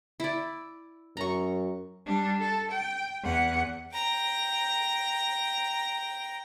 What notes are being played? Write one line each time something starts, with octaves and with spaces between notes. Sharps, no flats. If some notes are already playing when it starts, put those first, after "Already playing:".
E4 D5
F#2 A#5 C#6
G3 D4
A4
G5
E2 F#5
G5 A#5